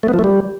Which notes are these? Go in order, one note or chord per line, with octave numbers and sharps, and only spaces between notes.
A3
B3
F3
A3
G3